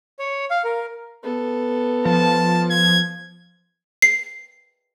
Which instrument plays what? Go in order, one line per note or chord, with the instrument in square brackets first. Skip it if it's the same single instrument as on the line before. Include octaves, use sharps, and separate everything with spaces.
[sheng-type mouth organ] C#5
F5
A#4
[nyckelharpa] B3 A4
[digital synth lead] F3 [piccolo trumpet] A5
[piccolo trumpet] G#6
[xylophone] C7